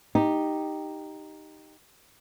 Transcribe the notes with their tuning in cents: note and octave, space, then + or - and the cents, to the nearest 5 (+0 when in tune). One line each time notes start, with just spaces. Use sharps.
D#4 -5 G4 +0